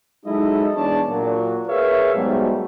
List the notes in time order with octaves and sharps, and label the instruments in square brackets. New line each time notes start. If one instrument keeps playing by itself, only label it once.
[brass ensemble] F#3 G#3 D#4 E4 A4 D#5
E2 G#3 D4 C#5 D5 A5
A#2 F#3
G#4 A#4 B4 C#5 E5 F5
G#2 B2 F#3 G3 A3